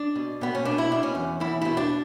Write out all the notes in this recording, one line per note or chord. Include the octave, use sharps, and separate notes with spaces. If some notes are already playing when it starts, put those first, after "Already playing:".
Already playing: D4
B2
B2 B3
C#4
B2 D4
E4
B2 D4
C#4
E2
E2 E4
B2 E4
D4